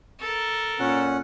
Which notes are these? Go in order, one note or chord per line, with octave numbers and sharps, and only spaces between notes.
A4 A#4
A#2 C#4 F#5